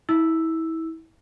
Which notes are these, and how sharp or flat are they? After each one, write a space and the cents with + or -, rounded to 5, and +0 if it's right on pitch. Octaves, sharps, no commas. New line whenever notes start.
E4 -30 E6 +0